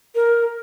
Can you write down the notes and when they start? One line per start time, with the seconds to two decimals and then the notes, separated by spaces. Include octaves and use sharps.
0.15 A#4